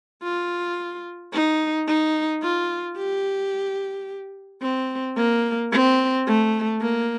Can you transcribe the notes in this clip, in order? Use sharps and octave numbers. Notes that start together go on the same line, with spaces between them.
F4
D#4
D#4
F4
G4
C4
A#3
C4
A3
A#3